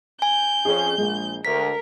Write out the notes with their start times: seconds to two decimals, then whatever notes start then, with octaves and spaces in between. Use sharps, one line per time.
0.22 G#5 G6
0.65 F2 C#4 G#4
0.98 A#1 G#3
1.45 D2 A#4 B6